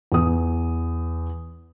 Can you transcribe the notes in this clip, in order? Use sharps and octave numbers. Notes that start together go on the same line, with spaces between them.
E2 D#6